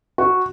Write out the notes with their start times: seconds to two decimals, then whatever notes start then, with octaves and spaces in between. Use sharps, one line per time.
0.18 F#4